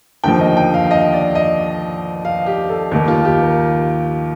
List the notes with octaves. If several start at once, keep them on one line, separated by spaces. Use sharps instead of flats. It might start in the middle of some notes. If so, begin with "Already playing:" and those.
D#2 D3 F3 G5
D#5
G5
F5
D#5
D5
D#5
F5
G4
A4
D#2 D#3 G4
F4
G4
A#4